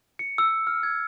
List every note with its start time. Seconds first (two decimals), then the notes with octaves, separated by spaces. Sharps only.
0.19 C#7
0.38 E6
0.67 F6
0.83 G#6